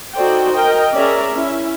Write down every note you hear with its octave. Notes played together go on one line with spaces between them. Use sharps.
D#4 F#4 A4 C5 D5 G5
A#4 D#5 G5
C#4 G#4 A#4 D5 E5 A#5
C#4 E4 E5